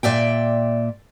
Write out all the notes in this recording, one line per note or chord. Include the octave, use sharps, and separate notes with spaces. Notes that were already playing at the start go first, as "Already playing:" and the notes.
A#2 D5 E5 G5